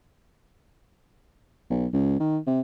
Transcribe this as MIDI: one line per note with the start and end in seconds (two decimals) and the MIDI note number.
1.70 1.87 35
1.93 2.15 37
2.20 2.38 51
2.47 2.60 48